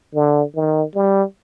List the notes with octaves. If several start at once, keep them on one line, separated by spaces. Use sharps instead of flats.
D3
D#3
G3